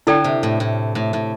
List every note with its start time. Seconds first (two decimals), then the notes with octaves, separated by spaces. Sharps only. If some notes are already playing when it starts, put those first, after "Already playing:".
0.07 D3 E4 A4 D5 G5
0.24 C3
0.43 A2
0.60 A2
0.95 A2
1.13 A2